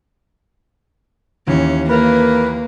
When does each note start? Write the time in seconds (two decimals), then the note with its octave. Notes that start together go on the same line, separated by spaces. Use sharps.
1.47 D#2 E3 C#4
1.90 A#3 A#4 B4